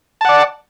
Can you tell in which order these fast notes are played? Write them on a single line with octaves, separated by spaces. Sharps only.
A5 F#5 D5